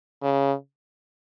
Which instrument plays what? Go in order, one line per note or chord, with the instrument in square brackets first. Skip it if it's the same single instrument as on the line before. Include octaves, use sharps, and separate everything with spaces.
[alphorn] C#3